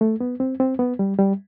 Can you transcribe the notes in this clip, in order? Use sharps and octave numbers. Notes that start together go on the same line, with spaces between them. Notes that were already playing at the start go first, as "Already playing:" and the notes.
A3
B3
C4
C4
B3
G3
G3